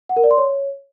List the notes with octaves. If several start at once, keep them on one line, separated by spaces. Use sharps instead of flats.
F#5
A#4
D5
C6
C#5